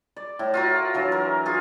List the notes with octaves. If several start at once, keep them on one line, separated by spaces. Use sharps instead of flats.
D5
A2
F4 F#4 A#4
E3 F#3 D4
A#4
F4 G#4